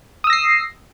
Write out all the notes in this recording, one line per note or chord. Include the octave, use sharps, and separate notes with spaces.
D#6 E6 A#6 C7